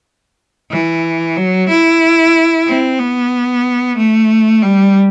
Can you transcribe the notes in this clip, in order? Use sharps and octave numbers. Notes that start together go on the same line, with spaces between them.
E3
F#3
E4
C4
B3
A3
G3